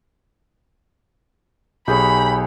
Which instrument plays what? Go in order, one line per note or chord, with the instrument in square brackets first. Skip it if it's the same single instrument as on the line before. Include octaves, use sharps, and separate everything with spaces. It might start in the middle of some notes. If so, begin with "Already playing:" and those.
[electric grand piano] B1 G6 [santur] G4 G#4 C#5 [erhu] B5